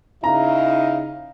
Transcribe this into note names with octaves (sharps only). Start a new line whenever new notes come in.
C#3 D#4 E4 F5 A#5